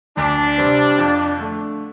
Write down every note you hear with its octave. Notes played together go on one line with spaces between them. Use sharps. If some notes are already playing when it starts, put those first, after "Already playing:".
D2 D4
C3 G3 C4
F2
D3 A3